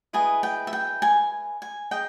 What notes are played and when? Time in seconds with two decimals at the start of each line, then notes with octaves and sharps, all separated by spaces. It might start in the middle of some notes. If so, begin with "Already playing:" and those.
0.13 E4 G#4 B4 D#5 G#5
0.43 G5
0.67 E5
0.73 G5
1.02 G#5
1.62 G#5
1.91 D#4 G#4 D#5 G5